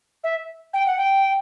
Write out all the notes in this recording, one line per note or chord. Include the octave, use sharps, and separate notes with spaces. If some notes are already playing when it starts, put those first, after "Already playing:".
E5
G5
F#5
G5